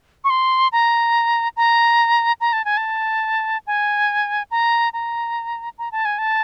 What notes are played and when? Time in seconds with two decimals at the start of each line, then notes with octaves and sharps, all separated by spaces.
0.24 C#6
0.30 C6
0.72 A#5
1.57 A#5
2.40 A#5
2.53 A5
2.65 G#5
2.77 A5
3.67 G#5
4.51 A#5
4.93 A#5
5.78 A#5
5.92 A5
6.05 G#5
6.19 A5